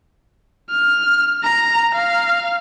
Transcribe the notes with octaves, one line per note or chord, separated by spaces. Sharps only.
F6
A#5
F5